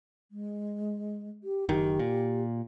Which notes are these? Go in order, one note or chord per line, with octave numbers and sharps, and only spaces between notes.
G#3
G4
F#1 D#3 G4
A#2